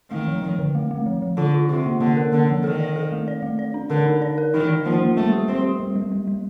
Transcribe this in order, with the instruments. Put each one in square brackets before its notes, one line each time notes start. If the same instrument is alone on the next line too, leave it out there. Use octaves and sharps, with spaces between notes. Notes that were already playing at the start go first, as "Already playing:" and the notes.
[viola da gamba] D#3 [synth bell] A3
[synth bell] F3
F3
D3
A3
A3
F3
F3
[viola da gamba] D3 [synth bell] F4
[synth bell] F4
[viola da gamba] C3 [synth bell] F4
[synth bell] A#3
[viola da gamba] D3 [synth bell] A#3
[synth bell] A#4
[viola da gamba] D3 [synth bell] A#3
[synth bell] F3
[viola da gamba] D#3 [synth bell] A4
[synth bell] D5
A4
A3
D5
A3
D5
D4
[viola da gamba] D3 [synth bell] A#4
[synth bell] D#4
D5
A#4
[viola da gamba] D#3 [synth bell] D#4
[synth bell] D5
[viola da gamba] F3 [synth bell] A#3
[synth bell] A#3
[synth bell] G3 [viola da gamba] A3
[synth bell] G4
[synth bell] G3 [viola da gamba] C4
[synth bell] G4
G3
G3
G3
G3